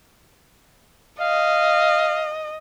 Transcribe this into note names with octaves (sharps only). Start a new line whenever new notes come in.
D#5 F5